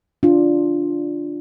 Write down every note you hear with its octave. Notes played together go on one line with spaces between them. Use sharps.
D4 F4